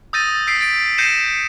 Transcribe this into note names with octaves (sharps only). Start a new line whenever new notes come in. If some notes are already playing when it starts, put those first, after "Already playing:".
D#6 E6 G6 A6 A#6 D#7
E6 G6 B6 C7 D7
A6 D7
G6 A#6 C7 C#7 D#7 E7